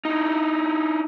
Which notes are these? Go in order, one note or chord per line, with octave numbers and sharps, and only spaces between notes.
D#4 E4